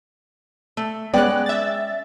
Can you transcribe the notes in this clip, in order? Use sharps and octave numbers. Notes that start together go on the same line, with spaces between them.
A3
G#3 B3 C#4 D5 G5 F#6
E5 A6